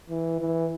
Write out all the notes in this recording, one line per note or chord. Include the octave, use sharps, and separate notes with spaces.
E3
E3